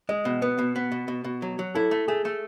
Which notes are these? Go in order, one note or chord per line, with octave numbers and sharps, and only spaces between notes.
G#3 D#5
B2
B3 B4
B2
B3
B2
B2
B2
F#3
F#3
E4 A4
A3
A3 G#4
A3